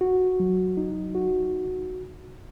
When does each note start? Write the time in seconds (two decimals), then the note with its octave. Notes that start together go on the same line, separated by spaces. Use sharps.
0.01 F#4
0.40 F#3
0.77 D#4
1.15 F#4